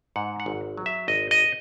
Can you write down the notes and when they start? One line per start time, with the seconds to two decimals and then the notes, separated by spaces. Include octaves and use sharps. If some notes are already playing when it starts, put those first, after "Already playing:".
0.16 G#2 F#5
0.40 F#5
0.46 G#1
0.77 F#3
0.86 E5
1.08 G#1 D#5
1.31 D#5